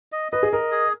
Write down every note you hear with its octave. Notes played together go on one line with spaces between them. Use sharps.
D#5
B4 D#5
G#4
A#4 D#5
G#4